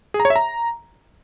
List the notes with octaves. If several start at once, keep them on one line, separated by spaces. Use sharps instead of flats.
G#4
A#5
C#5
E5
A#5